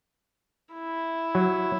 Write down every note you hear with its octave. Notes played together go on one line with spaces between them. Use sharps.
E4
F#3